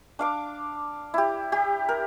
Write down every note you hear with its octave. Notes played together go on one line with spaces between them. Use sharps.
D4 F5 D6
E4 G4
G4
A#4